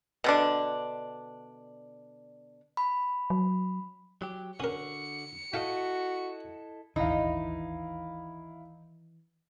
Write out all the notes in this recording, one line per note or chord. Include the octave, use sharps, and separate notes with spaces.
B2 D3 D4
B5
F#3
F#3 G4
D3 C#4 F#4 A#4 C#7
E4 F#4 A4 D#5 F5 G5
D#1 G#1 D2 D#3 E3 D#4 E4 F5